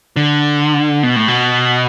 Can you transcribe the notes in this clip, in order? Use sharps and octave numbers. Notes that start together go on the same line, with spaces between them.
D3
B2
A2
B2